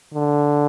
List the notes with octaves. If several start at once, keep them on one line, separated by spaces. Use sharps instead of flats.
D3